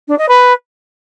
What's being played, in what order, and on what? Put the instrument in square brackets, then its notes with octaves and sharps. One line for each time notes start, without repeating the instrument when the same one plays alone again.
[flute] D4
D#5
B4